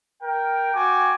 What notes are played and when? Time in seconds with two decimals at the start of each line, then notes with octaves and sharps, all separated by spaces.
0.23 A#4 G5
0.73 F#4 G5 G#5 D6